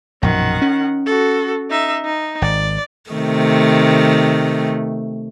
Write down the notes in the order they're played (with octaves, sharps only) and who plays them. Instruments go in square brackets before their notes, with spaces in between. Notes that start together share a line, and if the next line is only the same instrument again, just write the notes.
[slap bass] A#1 F#2 B2 [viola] D#3 F#5
[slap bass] C#4
[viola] F#4 A4
D#4 E5
D#4
[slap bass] G#1 [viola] D5
[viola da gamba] C3 D#3 A3